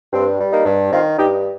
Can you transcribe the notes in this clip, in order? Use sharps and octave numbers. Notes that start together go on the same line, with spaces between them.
G2 C4
G3
A#3 D#4
G2
D#3 C4 F4
G2 D#4 G4